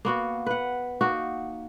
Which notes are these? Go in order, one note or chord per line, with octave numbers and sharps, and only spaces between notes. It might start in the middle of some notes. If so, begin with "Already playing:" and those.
A#3 B3 F#4
B4 F#5
A#3 D#4 F#4